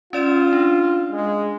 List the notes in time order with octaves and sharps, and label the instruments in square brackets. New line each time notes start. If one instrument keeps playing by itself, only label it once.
[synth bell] C#4 D5 E7 [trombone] F4
[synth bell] D4
[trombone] G#3